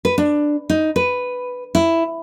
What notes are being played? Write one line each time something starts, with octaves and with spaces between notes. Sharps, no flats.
B4
D4
D#4
B4
E4